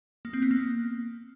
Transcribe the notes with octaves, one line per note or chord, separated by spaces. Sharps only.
A#3
C4
B3
A#3